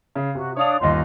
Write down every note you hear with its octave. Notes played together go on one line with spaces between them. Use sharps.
C#3
C3 F#4
D4 C#5 F5 D#6 F7
G1 D#2 D#5 C6